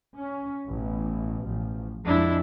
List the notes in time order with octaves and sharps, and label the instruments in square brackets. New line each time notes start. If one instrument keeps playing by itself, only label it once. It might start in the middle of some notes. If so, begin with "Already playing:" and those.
[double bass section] C#4
A1 B2 E3
A1 F3
[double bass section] F2 G#3 [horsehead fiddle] D4 E4